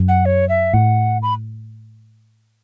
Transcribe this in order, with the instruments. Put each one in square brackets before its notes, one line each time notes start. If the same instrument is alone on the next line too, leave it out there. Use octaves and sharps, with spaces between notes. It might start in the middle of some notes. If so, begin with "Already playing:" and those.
Already playing: [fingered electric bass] F#2
[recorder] F#5
C#5
E5
[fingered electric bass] A2 [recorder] F#5
[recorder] B5